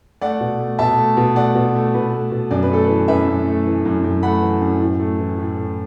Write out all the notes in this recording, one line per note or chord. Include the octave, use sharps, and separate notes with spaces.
A3 D5 F#5
B2
A3
B2 E5 A5
A3
B2
A3 D5 F#5
B2
A3
B2 B4
A3
B2
F#2 D5
B4
A3 A4
B4
E3
F#2 B4 E5
F#2
A3
E3
F#2
F#2
A3 F#5 B5
E3
F#2
A2
A3
E3
A2
A2